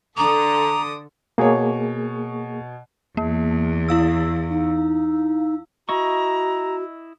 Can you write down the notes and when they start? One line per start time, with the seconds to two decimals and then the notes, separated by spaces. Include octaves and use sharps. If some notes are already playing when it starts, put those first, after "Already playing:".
0.18 D3 A4 A#5 D6 D#6
1.38 B2 A#3 G#4 C#5
3.17 E2 A#3
3.88 E4 F5 E6
4.50 D#4
5.89 E4 F#4 D#5 A#5 C#6